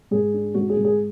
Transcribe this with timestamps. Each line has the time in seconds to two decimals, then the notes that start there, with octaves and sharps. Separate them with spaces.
0.11 G#2 G#4
0.34 D4
0.54 G#2 F#4
0.69 G#4
0.77 G#2
0.84 G#4